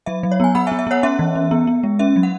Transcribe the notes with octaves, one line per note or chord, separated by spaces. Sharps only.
F#3 E5
F#3
C#5
B3 G#5
B3 F#5 B5
E5 G#5
B3
E5
B3 C#5 F#5
C#4 E5
E3
C#4
B3
B3
G#3
C#4 E5
F#3
F#5